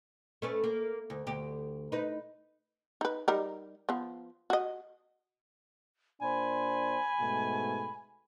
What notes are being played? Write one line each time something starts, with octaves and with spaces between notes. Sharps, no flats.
A3 C#4 B4
A#3
D2
D2 G4
D#4 B4
D#4 B4
G3 D#4 A#4
F3 B3
F#4 D#5
A#2 D4 C5 G#5 B5
G#2 B2 A3